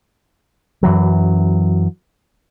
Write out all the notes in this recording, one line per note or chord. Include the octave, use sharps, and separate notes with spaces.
F#2 E3 F#3